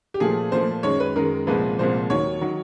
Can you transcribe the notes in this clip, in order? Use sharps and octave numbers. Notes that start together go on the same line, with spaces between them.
G4
A#2 F3 A3 G#4
A#2 F3 A3 C5
F#2 D#3 G#3 C#5
B4
F#2 D#3 G#3 A#4
C2 A#2 F3 G#3 B4
C2 A#2 F3 G#3 C5
D#2 D#3 F#3 C#5
D#3 F#3